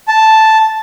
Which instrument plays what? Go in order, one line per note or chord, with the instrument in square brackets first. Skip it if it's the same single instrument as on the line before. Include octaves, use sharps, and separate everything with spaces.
[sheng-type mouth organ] A5